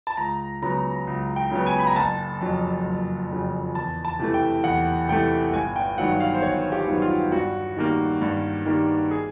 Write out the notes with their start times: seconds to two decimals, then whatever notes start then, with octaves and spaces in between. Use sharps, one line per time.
0.07 A5
0.17 C#2 A#5
0.62 C#3 F#3 B3 A#5
1.07 C#2
1.36 G5
1.51 C#3 F#3 B3
1.66 G#5
1.79 B5
1.87 A#5
1.96 F#1 A5
2.41 F2 C#3 F#3
2.85 F#1
3.30 F2 C#3 F#3
3.75 E2 A5
4.05 A5
4.19 C3 E3 A3
4.34 G5
4.64 E2 F#5
5.09 C3 E3 A3 G5
5.53 G1 G#5
5.76 G5
5.98 G2 D#3 F#3 B3 F#5
6.20 F5
6.34 C5
6.42 G1 C#5
6.72 G4
6.87 G2 D#3 F#3 B3
7.02 F4
7.32 G2 F#4
7.76 D#3 G3 A#3
8.22 G2
8.66 D#3 G3 A#3
9.11 G#4